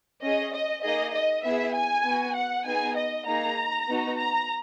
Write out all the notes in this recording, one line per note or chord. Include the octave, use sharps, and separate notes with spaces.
C#4 G#4 D#5
D#5
A#3 D#4 G#4 D#5
D#5
B3 E4 G#4 E5
G#5
B3 F#4
F#5
B3 D#4 G#4 G#5
D#5
A#3 D#4 G#4 A#5
B3 D#4 F#4
A#5